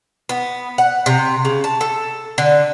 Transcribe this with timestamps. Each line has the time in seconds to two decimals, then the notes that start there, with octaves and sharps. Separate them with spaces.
0.29 B3
0.78 F#5
1.06 C3
1.45 C#3
1.64 A5
1.81 A4
2.38 D3